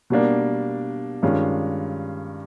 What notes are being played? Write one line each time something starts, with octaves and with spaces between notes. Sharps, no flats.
B2 G3 A#3 D4
G2 D#3 G#3 C#4 F4